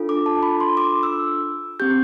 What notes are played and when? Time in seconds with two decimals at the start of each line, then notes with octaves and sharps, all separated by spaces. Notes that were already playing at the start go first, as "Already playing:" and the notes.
Already playing: D4 F4 A4
0.09 D6
0.26 A5
0.43 B5
0.60 C6
0.77 D6
1.03 E6
1.80 C4 G4 G6